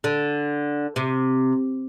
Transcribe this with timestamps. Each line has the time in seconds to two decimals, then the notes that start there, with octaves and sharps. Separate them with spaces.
0.04 D3
0.96 C3